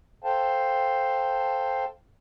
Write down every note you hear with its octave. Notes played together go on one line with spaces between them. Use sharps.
A4 C5 F5 G5 A5